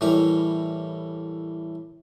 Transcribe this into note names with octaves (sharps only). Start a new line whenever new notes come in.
A2 E3 G3 A#4 D6